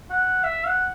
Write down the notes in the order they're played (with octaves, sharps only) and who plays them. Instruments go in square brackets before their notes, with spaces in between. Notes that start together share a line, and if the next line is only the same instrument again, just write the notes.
[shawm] F#5
E5
F#5